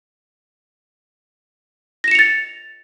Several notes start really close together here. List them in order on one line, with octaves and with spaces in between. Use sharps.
A#6 E7 C#7 F7 A6